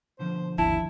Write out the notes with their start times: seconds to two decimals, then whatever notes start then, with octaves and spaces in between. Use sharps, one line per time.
0.19 B2 D3 F3 C5
0.58 G#1 D#2 E4 A5